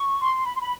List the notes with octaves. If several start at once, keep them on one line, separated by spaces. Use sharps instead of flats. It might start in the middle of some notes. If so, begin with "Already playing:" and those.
Already playing: C#6
C6
B5
C6
B5